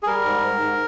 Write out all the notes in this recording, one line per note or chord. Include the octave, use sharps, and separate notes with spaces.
G#4
G3 A#4
G#2
G#2
G#2